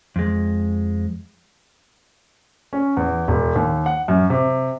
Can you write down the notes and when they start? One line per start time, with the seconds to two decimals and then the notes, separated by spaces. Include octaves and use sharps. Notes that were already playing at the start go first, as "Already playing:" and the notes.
0.16 F2 G#3
2.73 C#4
2.97 E2
3.28 E1
3.56 D#2
3.86 F#5
4.08 F#2
4.30 C3